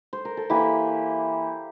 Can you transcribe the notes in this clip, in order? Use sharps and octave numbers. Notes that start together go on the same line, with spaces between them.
C5
A#4
A4
E3 A#3 E4 G4